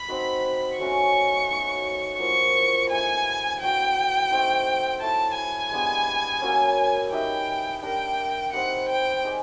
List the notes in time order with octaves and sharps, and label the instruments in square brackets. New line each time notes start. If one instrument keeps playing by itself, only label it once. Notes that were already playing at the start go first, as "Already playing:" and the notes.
Already playing: [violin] B5
[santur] C4 D#4 F#4 B4
[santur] F#3 A3 C#4 F#4 [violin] C#6
[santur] B3 D#4 F#4
[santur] F3 A#3 D4 F#4 [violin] C#6
[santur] G#3 B3 E4 A4 [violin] G#5
[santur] A3 D4 F#4 [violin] G5
[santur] A3 C4 D#4
[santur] E4 A4 C#5 E5 [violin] A5
[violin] G#5
[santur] G#3 B3 D4 G4
F#3 A#3 C#4
[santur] D#4 G4 B4 E5 [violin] G5
[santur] D4 G4 A#4 [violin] G5
[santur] C4 D#4 G4 B4 [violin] F#5
[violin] G5
[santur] D#4 G#4 B4 D5